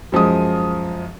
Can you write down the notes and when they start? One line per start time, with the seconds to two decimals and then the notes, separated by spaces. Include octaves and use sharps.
0.12 F#2 F3 G#3 D#6